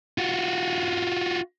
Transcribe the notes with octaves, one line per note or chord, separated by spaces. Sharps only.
F4 F#4